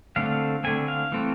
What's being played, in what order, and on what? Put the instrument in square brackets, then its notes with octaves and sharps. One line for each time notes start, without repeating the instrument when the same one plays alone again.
[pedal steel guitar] D3 A3 C4 F5
D3 A3 C4 G#5
F5
E3 A3 C4